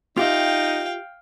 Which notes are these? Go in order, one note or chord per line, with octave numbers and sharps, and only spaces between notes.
D#4 F4 G4 E5 F5 G5